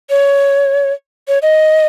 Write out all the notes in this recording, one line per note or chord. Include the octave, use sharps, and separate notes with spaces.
C#5
C#5
D#5